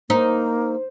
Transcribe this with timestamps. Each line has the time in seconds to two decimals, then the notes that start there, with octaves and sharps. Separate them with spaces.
0.10 A#3 D#4 C5